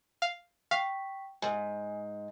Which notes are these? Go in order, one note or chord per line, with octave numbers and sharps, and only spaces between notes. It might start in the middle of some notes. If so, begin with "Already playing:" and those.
F5
F5 G5 C#6 B6
G#2 G#5